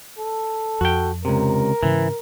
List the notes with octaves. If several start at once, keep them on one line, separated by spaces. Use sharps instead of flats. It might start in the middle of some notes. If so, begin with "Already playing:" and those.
A4
F2 F#4 G5
C#2 C3 A#4
G#2 C#3 E3